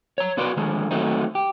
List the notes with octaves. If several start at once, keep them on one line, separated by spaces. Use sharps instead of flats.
C#5 A#5
B1 B3 F#4 B4 D5 C6
D3 D#3 F3 G#3
D#3 F#3 A3 C4 D#4
G4